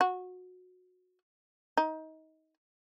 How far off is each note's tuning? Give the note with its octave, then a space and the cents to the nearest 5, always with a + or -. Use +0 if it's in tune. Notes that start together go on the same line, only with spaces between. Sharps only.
F#4 -20
D#4 +25